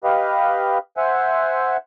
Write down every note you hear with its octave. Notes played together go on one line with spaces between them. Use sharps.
G4 B4 D#5 F5
C5 E5 F#5 G#5